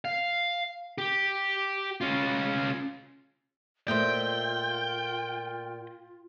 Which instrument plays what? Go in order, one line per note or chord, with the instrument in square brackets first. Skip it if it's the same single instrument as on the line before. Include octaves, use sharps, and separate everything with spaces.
[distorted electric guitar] F5
G4
C#4 F4
[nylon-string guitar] A#2 A3 [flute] F4 [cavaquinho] C5 D#5 E5 [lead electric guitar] G5